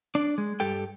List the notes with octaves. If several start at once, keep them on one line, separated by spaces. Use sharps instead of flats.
D4 D5
G#3
G2 G4 A4 G5